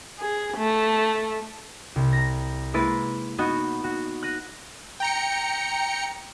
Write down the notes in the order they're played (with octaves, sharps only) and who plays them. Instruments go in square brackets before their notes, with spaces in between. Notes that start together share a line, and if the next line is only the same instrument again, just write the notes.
[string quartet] G#4
A3
[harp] C2
A#5 A#6
G#3 A#3 E4 B4 A6
B3 D#4 F#4
F#4
F#6 A#6 D#7
[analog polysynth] G5 A#5 C#7